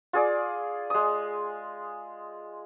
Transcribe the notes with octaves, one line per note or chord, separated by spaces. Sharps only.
F4 G#4 D5
G#3 D#6